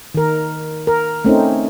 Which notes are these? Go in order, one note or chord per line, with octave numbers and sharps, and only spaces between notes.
D#3 A#4
A#4
A3 C4 C#4 D#4